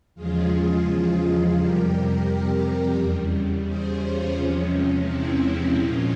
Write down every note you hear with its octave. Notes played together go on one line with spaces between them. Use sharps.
E2 C#3 F3 G#3 F4 G#4
F2 C3 G3 G4 A#4
E2 C#3 G3
G#4 C5
C#4 F4
E2 C3 F3 G#3 C#4
C4 E4
A#2 F3 G#3 C#4 F4